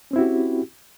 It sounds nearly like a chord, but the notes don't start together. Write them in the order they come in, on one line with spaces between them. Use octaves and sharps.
C#4 C4 E4 F#4 G4